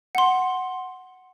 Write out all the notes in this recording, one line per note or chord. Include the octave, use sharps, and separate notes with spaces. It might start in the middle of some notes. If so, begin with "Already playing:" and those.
F#5 C6